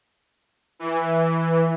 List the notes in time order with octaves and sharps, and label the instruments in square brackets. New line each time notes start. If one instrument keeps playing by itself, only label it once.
[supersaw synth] E3